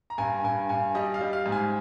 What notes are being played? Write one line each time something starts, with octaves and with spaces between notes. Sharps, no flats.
A#5
G2 G#5
G2 G#5
G2 G#5
G3 D#5
F5
G3
F5
G#2
G#5